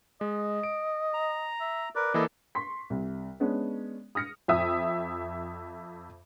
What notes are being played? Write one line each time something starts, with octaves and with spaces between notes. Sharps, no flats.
G#3 D#5
D7
A#5
E5
A#4 B4 D5
E3 A#3 E4 A4 D#5
C6 C#6 B6
C2
G#3 B3 C#4 D4
D#6 F6 A#6 C#7
F2 E5 D#6